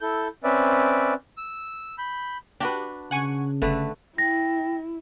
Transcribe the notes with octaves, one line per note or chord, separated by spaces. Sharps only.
E4 A4 G6
C4 C#4 B4 D5 E5
E6
B5 G6
D4 F#4 G4 B4
C#3 F#5 G#5 C#6
G1 D3 A3 B4
E4 G5 A#6